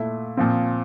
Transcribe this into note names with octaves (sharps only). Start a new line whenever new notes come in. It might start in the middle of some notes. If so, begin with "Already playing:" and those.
Already playing: A#2 A3 E4
A#2 F3 C4